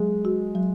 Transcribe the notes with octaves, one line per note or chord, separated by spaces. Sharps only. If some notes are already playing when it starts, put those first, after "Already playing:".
Already playing: F#3 G#3
F#4
F#3